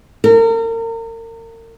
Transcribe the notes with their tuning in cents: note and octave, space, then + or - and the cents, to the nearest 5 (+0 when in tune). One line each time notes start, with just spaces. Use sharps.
A#4 -35